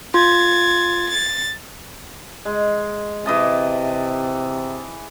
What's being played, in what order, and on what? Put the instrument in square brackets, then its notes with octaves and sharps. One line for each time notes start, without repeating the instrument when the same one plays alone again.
[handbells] F4 [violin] G#6 A6
[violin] A6
[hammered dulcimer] G#3
[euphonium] C3 [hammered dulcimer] E3 D#5 A5